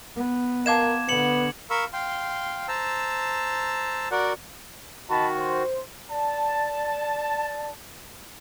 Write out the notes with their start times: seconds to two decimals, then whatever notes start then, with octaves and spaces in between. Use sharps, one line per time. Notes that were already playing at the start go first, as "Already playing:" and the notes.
0.16 B3
0.66 A#4 D#5 F5 A5 D6 G#6 E7
1.09 D3 B3 C#7 F#7
1.70 A#4 F5 B5 C#6 E6
1.93 F5 G5 C6
2.68 C5 A5 A#5 E6
4.11 F#4 A#4 D5 F#5
5.10 D#3 F#4 D#5 A5 B5
5.38 C5
6.10 D5 A5